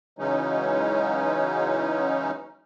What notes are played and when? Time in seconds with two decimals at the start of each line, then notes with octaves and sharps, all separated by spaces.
0.19 C#3 E3 F#3 G#3 C#4 D#4